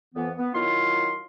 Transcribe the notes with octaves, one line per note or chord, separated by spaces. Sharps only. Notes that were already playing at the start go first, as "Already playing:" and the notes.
F2 E3 B3
B3
D#3 F#3 E4 F4 F5 C6